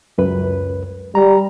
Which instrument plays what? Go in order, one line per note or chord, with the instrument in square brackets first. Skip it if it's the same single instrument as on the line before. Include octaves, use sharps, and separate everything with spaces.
[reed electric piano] C#2 F#2 B4
[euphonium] G3 [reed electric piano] A#5